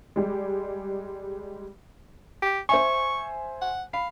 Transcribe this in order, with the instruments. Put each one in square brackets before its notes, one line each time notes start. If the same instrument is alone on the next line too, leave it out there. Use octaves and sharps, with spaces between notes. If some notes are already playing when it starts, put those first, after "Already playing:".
[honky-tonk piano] G3 G#3
[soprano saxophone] G4
[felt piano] C5 E5 G#5 [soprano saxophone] C#6
[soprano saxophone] F#5
[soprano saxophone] F5 [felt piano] B5